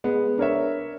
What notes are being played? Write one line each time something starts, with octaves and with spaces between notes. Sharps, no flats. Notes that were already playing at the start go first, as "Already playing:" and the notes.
G#3 B3
D4 A#4 C#5 E5